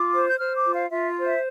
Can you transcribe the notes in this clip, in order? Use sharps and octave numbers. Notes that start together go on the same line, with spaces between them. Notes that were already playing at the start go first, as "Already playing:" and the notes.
Already playing: F4 D6
C5
G6
C5 F6
D6
F4
F5
F4 E5
C5
E5